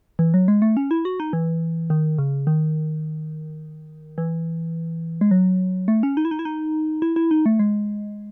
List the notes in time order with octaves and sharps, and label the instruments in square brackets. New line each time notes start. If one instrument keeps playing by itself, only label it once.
[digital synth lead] E3
F#3
G#3
A3
C#4
E4
F#4
D#4
E3
D#3
C#3
D#3
E3
G#3
F#3
A3
C#4
D#4
E4
D#4
E4
D#4
E4
E4
D#4
A3
G#3